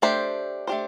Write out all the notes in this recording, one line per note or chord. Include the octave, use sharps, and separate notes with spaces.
A3 D4 G4 C5
A3 D4 G4 C5